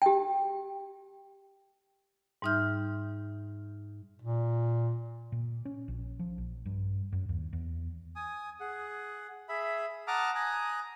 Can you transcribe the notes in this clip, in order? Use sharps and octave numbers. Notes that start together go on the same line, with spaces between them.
G4 G5
G#2 G3 D#4 E5 F6 G6
A#2
A#2
C#4
A#1
F3
A#1
G2
F#2
D#2
E2
G#5 D#6
G#4 F#5
G#4 E5 B5
F#5 A5 A#5 D6 D#6 F6
G#5 A#5 D#6 F#6